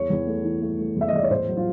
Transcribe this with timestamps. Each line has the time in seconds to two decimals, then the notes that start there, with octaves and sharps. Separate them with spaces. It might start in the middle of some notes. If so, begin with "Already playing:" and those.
Already playing: E2 C#5
0.10 E2
0.27 A3
0.44 E3
0.62 A3
0.79 A3
0.96 E2 E5
1.08 D#5
1.13 E2 D5
1.23 C#5
1.30 A2 C5
1.47 F#3
1.57 F4